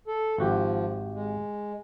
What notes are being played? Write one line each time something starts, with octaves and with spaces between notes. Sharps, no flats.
A4
G#1 F3 F#4 G4
G#3